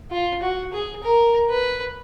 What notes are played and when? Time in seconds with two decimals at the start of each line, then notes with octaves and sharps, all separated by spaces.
0.11 F4
0.42 F#4
0.73 G#4
1.03 A#4
1.50 B4